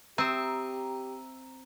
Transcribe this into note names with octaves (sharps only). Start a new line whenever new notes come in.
C4 G4 E5 A#5 D#6